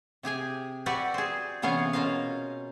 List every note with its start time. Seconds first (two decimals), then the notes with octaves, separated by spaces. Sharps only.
0.23 C3 G4 G#4 G#5
0.86 F#4 G4 B4 D5 E5 F#5
1.14 G#4 C5
1.62 C3 E3 B3 C#4 C#5 F5
1.93 B2 C#4 F4 A#4 C5 F5